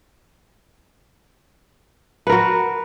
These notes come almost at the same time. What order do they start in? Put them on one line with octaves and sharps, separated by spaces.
B4 A#4 F#4